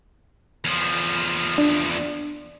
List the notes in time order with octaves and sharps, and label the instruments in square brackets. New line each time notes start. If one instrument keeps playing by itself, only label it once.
[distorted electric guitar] E2 F3
[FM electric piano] D4